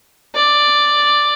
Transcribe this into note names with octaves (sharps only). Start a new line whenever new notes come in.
D5